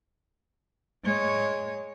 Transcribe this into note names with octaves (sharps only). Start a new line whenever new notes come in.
G#3 C#5